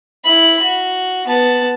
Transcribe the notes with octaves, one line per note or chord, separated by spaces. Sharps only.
E4 B5
F#4
B3 A5